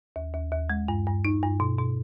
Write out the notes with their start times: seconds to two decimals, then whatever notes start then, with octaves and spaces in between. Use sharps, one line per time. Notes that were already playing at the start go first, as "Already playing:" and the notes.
0.16 D#2
0.34 D#2
0.52 D#2
0.70 G#3
0.88 G2
1.07 G2
1.25 D#4
1.43 G2
1.60 B2
1.79 B2